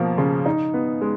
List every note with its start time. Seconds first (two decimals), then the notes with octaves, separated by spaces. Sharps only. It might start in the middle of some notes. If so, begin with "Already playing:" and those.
Already playing: B2 F3 A#3
0.18 C#3
0.46 D#4
0.74 B3
1.02 G#3